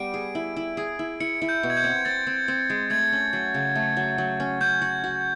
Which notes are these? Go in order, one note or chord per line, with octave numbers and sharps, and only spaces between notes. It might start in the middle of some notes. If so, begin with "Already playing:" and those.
Already playing: G3 B3 D7
G#4
E4
E4
G#4
E4
E4 C#7
E4
G6
B2
G#6
G6
C4
C4 A6
C4
C4
G#3
A3 G#6
C#4
F#3
C#3
A3
F#3
F#3
C#4
C#4 G6
F#4
F#4